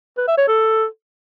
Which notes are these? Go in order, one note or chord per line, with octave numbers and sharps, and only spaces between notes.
B4
E5
C#5
A4